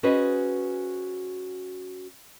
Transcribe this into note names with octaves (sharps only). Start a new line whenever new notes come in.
C#4 F#4 G#4 B4 C5 D#5